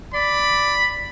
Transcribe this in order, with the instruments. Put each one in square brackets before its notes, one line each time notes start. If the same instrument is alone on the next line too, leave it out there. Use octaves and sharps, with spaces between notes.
[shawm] D5 [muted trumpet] B5